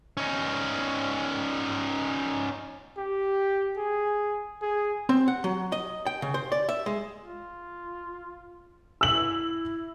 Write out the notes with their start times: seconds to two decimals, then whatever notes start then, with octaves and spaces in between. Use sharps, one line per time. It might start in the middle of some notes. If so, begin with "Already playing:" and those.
0.17 C#4 D#4
2.98 G4
3.77 G#4
4.62 G#4
5.09 C4
5.28 F#5
5.44 F#3
5.72 D#5
6.07 G5
6.22 C#3
6.34 C5
6.52 D5
6.69 E5
6.86 G#3
7.23 F4
9.01 E4 E6 F#7